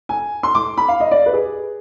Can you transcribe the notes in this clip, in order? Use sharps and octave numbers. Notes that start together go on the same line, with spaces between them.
G#5
C6
D6
B5
F5
D#5
D5
B4
G#4